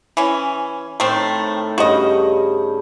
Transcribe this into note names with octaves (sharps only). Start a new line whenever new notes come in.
E3 C#4
A2 D#3 A3 C4
G2 C#3 F#4 D#5